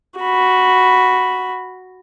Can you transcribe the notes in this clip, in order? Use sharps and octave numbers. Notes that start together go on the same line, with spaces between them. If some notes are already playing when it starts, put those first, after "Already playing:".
F#4 B5